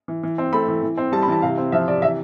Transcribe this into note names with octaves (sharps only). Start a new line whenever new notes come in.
E3
E3
C4
A3 B5
E3
E3
C4
G3 A5
B5
E3 A5
C3 F5
C4
F3 E5
C3 D5
E3 E5